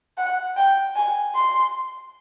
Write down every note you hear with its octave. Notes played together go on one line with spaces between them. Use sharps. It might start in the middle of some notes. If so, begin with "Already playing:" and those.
F#5
G5
G#5
C6